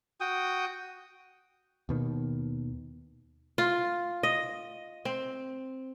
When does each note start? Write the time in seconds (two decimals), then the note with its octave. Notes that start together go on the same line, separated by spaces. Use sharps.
0.21 F#4 G5 D#6
1.89 D#2 B2 D#3
3.58 F4
4.23 D#5
5.05 C4